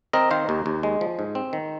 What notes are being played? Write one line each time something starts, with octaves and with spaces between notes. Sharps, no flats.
C4 A#4 D#5
D#3 C5 F5
D#2
D#2
G#3
F3
G#2
C4
D#3